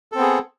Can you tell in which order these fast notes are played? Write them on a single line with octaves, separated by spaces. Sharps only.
A4 C4 B3 G#4